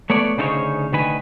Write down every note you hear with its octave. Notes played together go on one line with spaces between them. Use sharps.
A3 B3 C#5 D5
D2 C#3 D#4 A4 C5 C#5
D2 D#3 B4 G#5